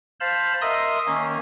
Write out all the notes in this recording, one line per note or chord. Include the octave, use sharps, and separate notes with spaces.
C5 F5 A5 B5
A#4 D#5 E5 C6 D#6
D#3 A#3 C#4